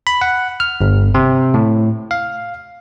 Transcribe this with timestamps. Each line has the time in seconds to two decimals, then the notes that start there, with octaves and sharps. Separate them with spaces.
0.07 B5
0.21 F#5
0.60 F6
0.81 G1
1.15 C3
1.54 A2
2.11 F5